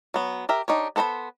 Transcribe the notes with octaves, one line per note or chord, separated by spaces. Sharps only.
F#3 B3
G4 A#4 E5
D4 D#4 G4 C#5
B3 A4 C5 A#5 B5